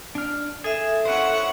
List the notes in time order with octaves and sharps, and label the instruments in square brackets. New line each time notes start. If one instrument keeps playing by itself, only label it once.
[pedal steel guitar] D4 F6
[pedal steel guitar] G#4 [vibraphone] A4 E5
[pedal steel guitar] C#4 E4 C5 [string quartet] F#5 C#6 D#6